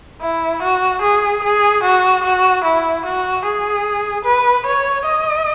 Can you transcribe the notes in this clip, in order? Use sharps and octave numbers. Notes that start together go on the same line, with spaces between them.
E4
F#4
G#4
G#4
F#4
F#4
E4
F#4
G#4
B4
C#5
D#5